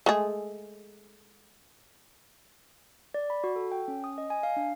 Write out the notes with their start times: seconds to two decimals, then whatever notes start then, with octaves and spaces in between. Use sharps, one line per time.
0.06 G#3 A3 G#4
3.14 D5
3.30 B5
3.44 F#4
3.56 A4
3.72 G5
3.88 C#4
4.04 D#6
4.18 D#5
4.30 G#5
4.43 F5
4.57 D4